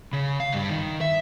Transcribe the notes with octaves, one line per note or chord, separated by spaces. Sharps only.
C#3
F5
G2 G3
D#3
E5